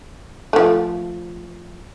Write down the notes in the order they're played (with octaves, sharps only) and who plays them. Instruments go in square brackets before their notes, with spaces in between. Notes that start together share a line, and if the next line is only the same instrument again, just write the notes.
[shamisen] F3 A3